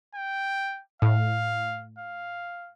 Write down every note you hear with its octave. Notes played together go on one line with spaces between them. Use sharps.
G5
A2 F5
F5